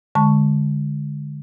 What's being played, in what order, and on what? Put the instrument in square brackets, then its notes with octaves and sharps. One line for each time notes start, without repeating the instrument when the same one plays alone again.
[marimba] D3 G#3 A5 C#6